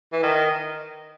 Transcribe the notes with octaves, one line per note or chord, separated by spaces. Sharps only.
E3
D#3